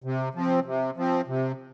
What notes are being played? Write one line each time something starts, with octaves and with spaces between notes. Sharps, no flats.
C3
F3 C4
C3
F3 C4
C3